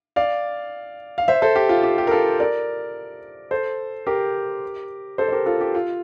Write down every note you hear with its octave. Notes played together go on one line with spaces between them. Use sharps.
D5 F5
F5
C5 E5
A4 C5
G4
F4
G4
G4
A#4
F4 A4
A#4 D5
A4 C5
G4 A#4
A4 C5
C5
G4 A#4
F4 A4
G4
F4